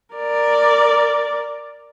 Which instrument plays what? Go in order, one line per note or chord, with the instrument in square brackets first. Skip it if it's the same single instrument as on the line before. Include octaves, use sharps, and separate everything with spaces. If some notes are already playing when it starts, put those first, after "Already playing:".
[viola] A#4 D5